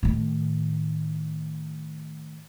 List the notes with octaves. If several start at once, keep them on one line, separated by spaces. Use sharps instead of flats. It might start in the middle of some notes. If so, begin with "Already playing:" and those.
A2 D#3